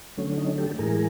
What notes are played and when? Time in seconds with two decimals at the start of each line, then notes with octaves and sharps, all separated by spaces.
0.17 D3 F#3 A3 C#4
0.38 C#4 D#4
0.58 G4 A4
0.78 A2 E3 G#3 G#4 A#4